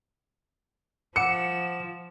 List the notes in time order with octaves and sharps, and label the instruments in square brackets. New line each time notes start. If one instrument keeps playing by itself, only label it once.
[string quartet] F3 [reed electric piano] F#5 D6 E6 [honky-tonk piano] C#7 [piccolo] E7